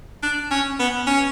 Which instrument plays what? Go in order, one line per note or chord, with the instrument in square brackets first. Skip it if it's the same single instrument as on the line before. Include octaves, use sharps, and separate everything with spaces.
[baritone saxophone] D4
C#4
B3
C#4